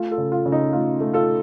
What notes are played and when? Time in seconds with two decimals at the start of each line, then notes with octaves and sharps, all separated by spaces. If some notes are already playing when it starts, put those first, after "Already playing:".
Already playing: A3 F4
0.11 F4 A4
0.18 C#3
0.32 F4
0.45 C#3
0.52 D#4
0.72 A3 F4
1.00 A3
1.13 F4 A4